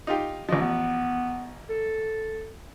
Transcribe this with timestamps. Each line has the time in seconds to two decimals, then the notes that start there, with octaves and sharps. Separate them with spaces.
0.07 D#4 F4 G4
0.49 A1 F3 D#5
0.60 B3
1.70 A4